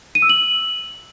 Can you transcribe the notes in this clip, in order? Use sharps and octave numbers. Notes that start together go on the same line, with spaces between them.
D#7
E6
F#7